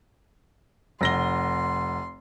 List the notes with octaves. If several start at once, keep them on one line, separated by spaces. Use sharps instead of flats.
F1 C6 A#6 G7